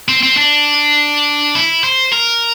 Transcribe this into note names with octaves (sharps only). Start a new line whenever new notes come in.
C4
C4
D4
E4
C5
A#4